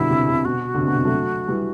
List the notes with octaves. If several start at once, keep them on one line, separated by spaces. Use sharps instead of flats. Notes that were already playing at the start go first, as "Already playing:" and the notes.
Already playing: B2 D3 G3 B3 E4
C3
C3
B2 F#4
D3
C3
B2 D3
C3
F#3 A3
E3 G3